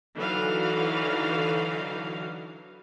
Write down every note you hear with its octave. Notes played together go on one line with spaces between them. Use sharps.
D3 E3 F#3 D#4 F#4 F5